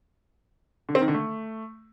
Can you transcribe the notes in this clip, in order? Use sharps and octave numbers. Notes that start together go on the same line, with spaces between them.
D3
C4
D#3
D3
A3